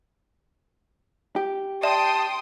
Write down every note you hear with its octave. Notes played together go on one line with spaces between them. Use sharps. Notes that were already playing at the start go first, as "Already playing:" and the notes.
G4
D5 E5 G5 A5 C6 D#6 E7